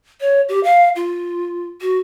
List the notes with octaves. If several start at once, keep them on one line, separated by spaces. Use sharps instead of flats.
C#5
G4
F5
F4
F#4